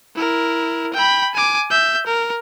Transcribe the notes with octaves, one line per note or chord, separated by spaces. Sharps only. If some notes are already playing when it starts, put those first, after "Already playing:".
E4 A#4
G5 B5
G#5 D6
E5 G6
A#4